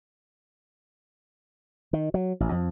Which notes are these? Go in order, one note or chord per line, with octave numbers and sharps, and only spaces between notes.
D#3
F#3
A1
F2